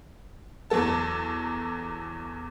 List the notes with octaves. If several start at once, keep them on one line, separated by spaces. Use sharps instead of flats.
E2 F#3 A4 A5